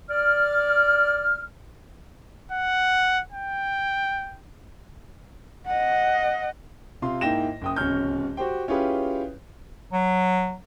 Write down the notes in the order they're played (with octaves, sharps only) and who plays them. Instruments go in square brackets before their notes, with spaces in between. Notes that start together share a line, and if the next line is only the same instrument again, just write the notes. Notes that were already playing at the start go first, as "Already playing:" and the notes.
[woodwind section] D5 F6
[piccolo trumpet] F#5
G5
[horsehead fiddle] D#5 F#5
[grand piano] C3 F4 C6
G#2 A#3 E4 G5 A#6 E7
F#1 G5 D#6
D1 C#2 C#4 F6 G6
F#4 G4 C5 G5
C#4 E4 F4 G4 G#4 B4
[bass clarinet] F#3